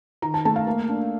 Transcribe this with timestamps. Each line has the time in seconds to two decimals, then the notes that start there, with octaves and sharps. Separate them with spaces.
0.22 D#3 A#5
0.34 A5
0.45 A3 A5
0.56 F5
0.67 A#3
0.89 D4